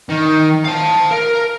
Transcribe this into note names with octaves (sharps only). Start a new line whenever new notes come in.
D#3
F5 A5
A#4